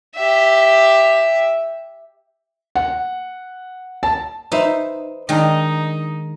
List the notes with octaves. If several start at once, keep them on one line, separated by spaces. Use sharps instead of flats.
G4 E5
F#5
A5
D#4 B4 C5 E5
D#3 G#3 D4 D#4 G5